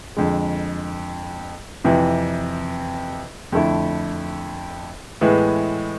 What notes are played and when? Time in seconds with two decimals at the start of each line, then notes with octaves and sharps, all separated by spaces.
0.17 F2 D3 G#3
1.84 F2 C3 E3
3.52 F2 D3 A3 E4
5.21 A2 E3 G#3 B3